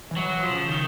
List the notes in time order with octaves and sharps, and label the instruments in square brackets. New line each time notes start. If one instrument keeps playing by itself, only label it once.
[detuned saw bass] E3
[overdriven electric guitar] F#3
[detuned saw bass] E3
[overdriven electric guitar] F3
[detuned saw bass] C#3
[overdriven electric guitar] D#3